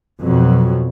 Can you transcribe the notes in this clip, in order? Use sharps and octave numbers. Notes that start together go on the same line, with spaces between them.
F2 B2 F#3